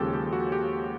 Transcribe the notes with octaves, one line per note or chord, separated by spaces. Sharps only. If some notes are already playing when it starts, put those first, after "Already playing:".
Already playing: D#2 C#3 F3 G#3 G4 A4
G4
F#4
G4